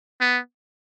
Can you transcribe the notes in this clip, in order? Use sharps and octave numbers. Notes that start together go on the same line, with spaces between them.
B3